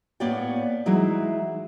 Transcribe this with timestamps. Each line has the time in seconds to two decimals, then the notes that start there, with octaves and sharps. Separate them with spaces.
0.20 A2 A#3 B3 C#5 D5 G5
0.86 E3 F#3 G#3 D#4 E4